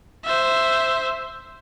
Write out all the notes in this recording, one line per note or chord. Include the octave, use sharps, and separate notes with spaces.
C5 E5